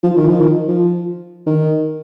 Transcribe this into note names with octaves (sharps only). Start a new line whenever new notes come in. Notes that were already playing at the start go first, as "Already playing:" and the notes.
F3
D#3
F3
D#3
F3
D#3